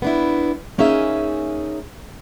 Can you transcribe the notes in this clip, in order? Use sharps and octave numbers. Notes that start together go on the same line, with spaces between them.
B3 D4 E4
A#3 C#4 D#4 G#4 E5